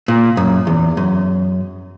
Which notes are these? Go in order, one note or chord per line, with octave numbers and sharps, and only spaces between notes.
A#2
F#2
E2
F#2